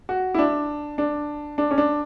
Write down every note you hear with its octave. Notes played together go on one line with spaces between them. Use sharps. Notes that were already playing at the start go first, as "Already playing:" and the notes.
F#4
E4
D4
D4
D4
C#4
D4